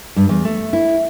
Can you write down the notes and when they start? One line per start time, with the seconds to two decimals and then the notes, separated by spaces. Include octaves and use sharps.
0.16 G2
0.29 E2
0.45 A3
0.73 E4